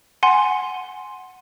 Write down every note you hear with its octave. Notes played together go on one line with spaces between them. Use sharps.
F#5 G#5 C6